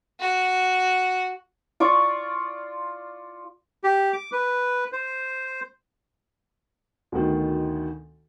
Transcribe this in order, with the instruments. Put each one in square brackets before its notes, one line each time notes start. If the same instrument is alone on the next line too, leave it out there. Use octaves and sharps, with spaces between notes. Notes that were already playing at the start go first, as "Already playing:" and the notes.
[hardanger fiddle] F#4
[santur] F4 D5 C#6
[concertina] G4
D6
B4
C5
[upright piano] D2 B2 D#3